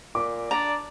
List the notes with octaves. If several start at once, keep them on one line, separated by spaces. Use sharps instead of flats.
A#2 D6
D4 D5 A#5